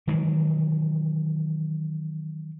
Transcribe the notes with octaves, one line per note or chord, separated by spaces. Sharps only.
D#3 E3 F#3 G#3